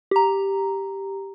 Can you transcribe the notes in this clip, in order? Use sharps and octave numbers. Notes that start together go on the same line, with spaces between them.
G4 A#5